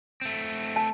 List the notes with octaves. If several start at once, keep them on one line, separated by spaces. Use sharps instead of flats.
A3 C4
A5